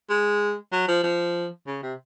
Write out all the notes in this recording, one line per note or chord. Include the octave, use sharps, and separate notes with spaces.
G#3
F#3
F3
F3
C#3
C3